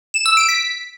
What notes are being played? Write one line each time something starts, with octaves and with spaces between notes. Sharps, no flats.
E7
E6
D7
B6